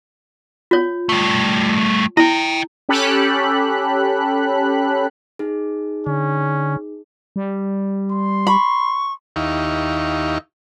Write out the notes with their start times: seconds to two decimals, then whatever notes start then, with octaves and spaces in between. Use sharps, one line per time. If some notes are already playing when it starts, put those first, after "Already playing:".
0.71 F4 C#5
1.09 G3 A3
2.17 E4 D#5 G5
2.89 C#4 G4 A4 B5 F#6
5.39 D#4 G#4
6.06 D3 C#4
7.36 G3
8.12 C6
8.47 B5 C#6
9.36 D#2 D#4 E4 G4 F5 C#6